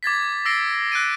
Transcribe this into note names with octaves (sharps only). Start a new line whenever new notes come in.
D6 G#6 A6 B6
D6 E6 A#6 C7 D7 G7
E6 F#6 A#6 D7 D#7